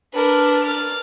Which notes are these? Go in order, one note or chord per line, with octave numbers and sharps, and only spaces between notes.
D4 A#4 B4
F6 A6